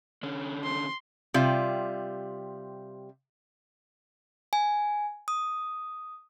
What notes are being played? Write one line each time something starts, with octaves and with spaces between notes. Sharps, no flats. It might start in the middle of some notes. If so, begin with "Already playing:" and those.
D3 C#4
C6
C3 G3 F4
G#5
D#6